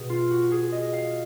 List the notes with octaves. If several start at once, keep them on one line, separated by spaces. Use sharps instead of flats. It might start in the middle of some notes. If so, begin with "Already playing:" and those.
Already playing: B2 G#3 G#4
F4
F#4
G#4
D#5
F5